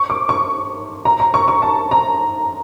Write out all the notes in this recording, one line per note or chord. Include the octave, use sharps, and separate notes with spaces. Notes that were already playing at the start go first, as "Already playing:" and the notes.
Already playing: C#6
D6
C#6
A#5
A#5
C#6
C#6
A5
A#5